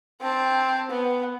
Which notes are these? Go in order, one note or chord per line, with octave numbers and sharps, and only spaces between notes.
C4 A5
B3